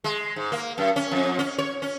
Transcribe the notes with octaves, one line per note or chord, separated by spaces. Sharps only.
G#3
G#2
A#3
F#2
C#4
F2
C#4
C#5
C#4